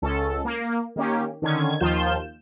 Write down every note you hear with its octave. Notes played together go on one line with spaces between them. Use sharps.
C#2 C#4 A4
A#3
D#3 A#3 C#4 G4
D3 D#3 C#4 G#6
D#2 D#3 F3 F4 G6 E7